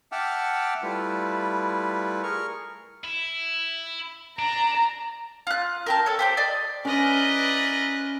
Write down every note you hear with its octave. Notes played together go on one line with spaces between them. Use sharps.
E5 F#5 G5 A5 D6 F6
G3 A3 E4 F4 B4
G#4 A#4 C#6 F6
E4
D4 A#5
F4 F#6
A#4 G5 A5
A4 C#5
G4 C5 G5
D5 D#5 C6
C#4 E4 A#4 B4 D5 D#5